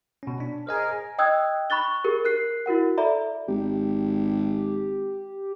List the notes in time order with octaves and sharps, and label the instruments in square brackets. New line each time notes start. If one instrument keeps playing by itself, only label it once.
[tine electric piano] B2 C#4
D4
[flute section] G#4 A#4 F6 [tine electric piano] C5 D#5 G#5
[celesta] D#5 G5 D#6 E6 F#6 G#6
B5 C#6 F#6 A6 G7
G4 G#4 A#4
A#4 F#6 C7
E4 F#4 A#4 F#5
A4 D5 E5 A#5 B5
[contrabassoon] G#1 [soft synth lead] G4